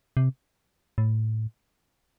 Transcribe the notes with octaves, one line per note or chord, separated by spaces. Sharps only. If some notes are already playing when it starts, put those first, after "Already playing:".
C3
A2